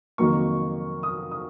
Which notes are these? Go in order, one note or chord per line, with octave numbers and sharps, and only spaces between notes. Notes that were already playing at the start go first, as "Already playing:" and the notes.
F2 D#3 F#3 A#3 C#6
D#6
D#6